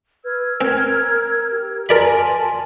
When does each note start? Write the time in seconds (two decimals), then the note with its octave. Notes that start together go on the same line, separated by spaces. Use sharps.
0.24 B4 E6 F6 G#6
0.61 C4 A#4
1.49 G4
1.89 A#4 D5 G#5 A5 B5 C6